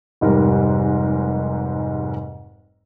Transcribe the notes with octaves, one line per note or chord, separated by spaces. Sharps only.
F1 G#2 G3 A#4